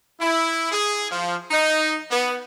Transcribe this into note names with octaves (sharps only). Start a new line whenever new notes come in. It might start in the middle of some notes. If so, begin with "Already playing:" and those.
E4
G#4
F3
D#4
B3